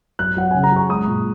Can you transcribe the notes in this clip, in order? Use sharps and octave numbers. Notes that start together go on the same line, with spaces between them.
F#3 F#6
F#3 F#5
C#3 G#5
A#5
F#3 C#6
G#3 D#6
A#2